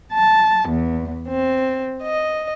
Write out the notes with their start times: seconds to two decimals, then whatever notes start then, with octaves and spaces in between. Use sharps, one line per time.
0.12 A5
0.69 E2
1.28 C4
2.02 D#5